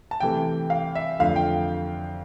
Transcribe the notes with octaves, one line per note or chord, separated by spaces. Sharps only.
A5
C3 E3 A3 G5
F5
E5
F2 D3 F3 A3 F5
G5